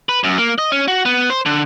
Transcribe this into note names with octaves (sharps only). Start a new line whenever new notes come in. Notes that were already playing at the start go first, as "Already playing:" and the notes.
B4
F#2
A#3
D#5
C#4
F#4
B3
C5
D3